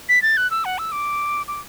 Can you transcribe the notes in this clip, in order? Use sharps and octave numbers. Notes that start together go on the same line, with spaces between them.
B6
A6
F#6
E6
F#5
E6
D6
D6